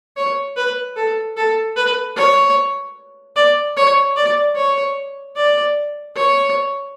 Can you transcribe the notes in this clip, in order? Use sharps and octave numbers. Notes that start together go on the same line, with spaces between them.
C#5
B4
A4
A4
B4
C#5
D5
C#5
D5
C#5
D5
C#5